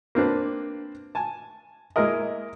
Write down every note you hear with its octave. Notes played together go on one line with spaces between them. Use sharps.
A#3 C4 D4 B4
G#5 A5
G#3 A#3 E4 A#4 D#5